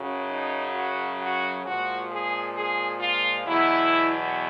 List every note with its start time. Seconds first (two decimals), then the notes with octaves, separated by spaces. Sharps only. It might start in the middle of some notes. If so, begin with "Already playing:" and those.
Already playing: F#2 C#3 F#3
0.29 D#4
0.74 F#4
1.19 F#4
1.64 A#2 F3 G#3 F#4
2.10 G#4
2.55 G#4
3.00 F4
3.45 E2 B2 F#3 E4